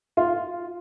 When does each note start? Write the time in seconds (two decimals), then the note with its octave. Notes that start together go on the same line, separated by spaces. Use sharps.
0.17 F4